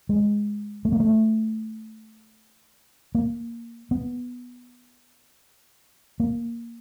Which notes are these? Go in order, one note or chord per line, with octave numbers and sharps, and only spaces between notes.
G#3
A3
A#3
A3
A#3
B3
A#3